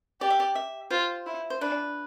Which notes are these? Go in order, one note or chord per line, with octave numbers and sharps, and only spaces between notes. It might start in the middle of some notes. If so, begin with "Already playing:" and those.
G4 D5
E5
D5
E5
F4 C5
E4
C5
D4 B4